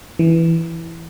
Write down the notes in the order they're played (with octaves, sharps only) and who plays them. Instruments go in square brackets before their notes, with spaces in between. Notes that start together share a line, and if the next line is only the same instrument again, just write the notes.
[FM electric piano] E3